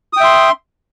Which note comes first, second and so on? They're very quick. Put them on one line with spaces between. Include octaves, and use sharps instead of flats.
D#6 G5 E5 C6